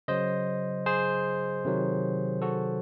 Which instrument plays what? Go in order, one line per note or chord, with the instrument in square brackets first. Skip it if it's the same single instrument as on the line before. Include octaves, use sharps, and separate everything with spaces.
[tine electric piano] C#3 F#3 C5 D#5
G#4 C5
C3 D#3 F#3
F#4 A4